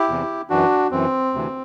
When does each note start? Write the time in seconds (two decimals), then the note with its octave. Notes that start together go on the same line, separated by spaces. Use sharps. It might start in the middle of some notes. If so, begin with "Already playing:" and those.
Already playing: E4 G4
0.09 E2 C3 E3
0.50 F#2 E3 D4 F#4
0.91 F#2 E3 C4
1.34 D2 C3 E3